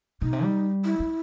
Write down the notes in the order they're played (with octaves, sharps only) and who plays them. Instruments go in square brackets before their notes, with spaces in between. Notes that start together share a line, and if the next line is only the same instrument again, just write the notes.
[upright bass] B2 [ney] D#4
[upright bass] C3
G3
[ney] E4
[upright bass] G3